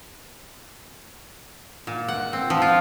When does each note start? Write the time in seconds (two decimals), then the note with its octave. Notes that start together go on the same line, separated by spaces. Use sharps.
1.87 A#2
2.08 F#5
2.33 C4
2.50 F3
2.62 F4